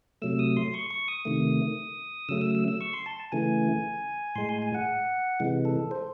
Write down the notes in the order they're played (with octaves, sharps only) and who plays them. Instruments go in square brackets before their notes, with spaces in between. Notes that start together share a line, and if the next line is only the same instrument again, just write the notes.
[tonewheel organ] C3 F#3 A3 E6
D#6
C6
C#6
C#6
D#6
C3 D#3 A3
C#3 F#3 A3 E6
E6
E6
E6
C#6
C6
A5
C#3 E3 A3 G#5
A2 G#3 C6
G#5
G#5
F#5
C3 E3 G#3
A4
C5